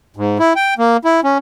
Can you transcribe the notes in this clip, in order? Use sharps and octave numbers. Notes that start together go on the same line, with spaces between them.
G#2
E4
G5
A#3
E4
C#4